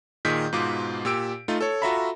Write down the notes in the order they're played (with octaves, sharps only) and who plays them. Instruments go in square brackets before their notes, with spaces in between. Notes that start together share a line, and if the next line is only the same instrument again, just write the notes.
[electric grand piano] A#2 D#3 G#4 D#5 G6 B6
G#2 B2 F4 D6
A#2 G4 E6 D7
A3 D#4 F4
A4 C#5
F4 F#4 A4 E5 A#5 B5